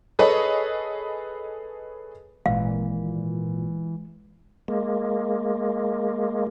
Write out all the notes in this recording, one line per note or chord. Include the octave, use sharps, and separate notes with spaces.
G#4 A4 B4 C#5 D#5
G#1 A#2 E3 G#3 F5
G#3 A#3